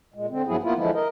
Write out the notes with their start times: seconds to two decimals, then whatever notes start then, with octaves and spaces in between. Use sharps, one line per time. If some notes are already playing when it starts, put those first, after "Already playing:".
0.14 A#2 G#3
0.29 D3 C4
0.46 G2 F3 F#3 B3 E4 G#4
0.63 A#3 B3 E4 F4
0.76 D3 E3 F3 G#3 E4
0.94 A#4 D#5